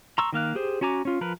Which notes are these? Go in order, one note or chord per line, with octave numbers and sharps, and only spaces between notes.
A#5 C6 C#6 E6
D#3 A#3 F5 F#6
G4 G#4 C5
C#4 F#4 G#5 A#5 D6
C#4 F4
F3 A#4 B4